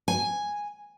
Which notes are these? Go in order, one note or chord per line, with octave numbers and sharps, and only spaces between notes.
G#5